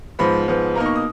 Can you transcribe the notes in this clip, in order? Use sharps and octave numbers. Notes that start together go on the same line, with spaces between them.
G#2 F3 B3 B5
G#2 F3 B3
B2 A#3 D#4 A#5
C#6
D#6